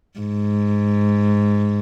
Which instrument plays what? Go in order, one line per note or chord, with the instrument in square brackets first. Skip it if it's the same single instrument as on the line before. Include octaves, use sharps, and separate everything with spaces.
[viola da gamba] G#2